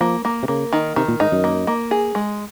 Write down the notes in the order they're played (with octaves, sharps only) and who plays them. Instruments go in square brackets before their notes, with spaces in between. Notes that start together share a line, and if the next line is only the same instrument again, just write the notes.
[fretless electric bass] F3 [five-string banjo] A#3
[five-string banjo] A#3
[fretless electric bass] C3
[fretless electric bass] C#3 [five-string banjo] A#3
[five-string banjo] D#3
[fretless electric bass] C3 [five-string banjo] D#3
[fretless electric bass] A#2
[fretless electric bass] G#2 [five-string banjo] D#4
[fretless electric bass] F#2
[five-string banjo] A#3
A#3
G#4
G#3